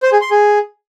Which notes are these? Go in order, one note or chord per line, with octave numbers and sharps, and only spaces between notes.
C5
G#4
C6
G#4